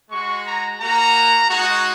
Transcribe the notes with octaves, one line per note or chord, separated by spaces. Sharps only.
G#3 F#4 C#6
A#5
A#3 F#4 A#5
G#3 D#4 F#4